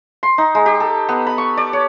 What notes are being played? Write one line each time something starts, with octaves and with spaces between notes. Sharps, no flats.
C6
D#4
G#3
G4
A4
B3
B5
C#6
D5
C#5